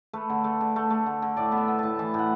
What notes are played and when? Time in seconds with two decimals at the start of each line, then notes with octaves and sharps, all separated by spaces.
0.13 A3 B4
0.30 D3
0.44 A3
0.61 D3
0.76 A3
0.90 A3
1.06 D3
1.22 D3
1.37 A2 D5
1.52 B3
1.57 E5
1.68 B3
1.79 A2 A5
1.99 E3 A5
2.14 A2 F#5